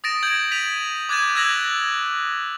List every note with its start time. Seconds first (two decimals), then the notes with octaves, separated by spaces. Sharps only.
0.04 D#6 A6 A#6 D7 E7
0.23 G6 G#6 F#7
0.51 B6 D#7 F7
1.09 D6 F#6 G#6 A6 D#7 E7
1.35 E6 F#6 G#6 A#6 F7 F#7